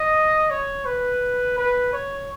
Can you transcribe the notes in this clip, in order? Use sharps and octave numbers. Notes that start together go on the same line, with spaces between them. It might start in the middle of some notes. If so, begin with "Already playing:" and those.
Already playing: D#5
C#5
B4
B4
C#5